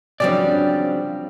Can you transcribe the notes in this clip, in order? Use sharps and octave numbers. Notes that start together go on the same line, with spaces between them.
G2 C#3 F3 F#3 C4 G4 D5